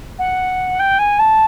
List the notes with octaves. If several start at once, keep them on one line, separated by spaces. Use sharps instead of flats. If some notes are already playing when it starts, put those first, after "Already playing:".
F#5
G5
G#5
A5